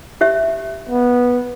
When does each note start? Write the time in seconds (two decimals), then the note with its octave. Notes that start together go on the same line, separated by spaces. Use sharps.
0.21 G4 C#5 E5
0.89 B3